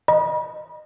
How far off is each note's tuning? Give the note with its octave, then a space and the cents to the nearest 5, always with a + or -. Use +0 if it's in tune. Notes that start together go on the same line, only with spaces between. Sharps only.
D#5 -15 B5 -40